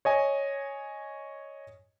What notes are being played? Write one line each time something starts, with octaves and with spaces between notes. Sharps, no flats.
C#5 D#5 G#5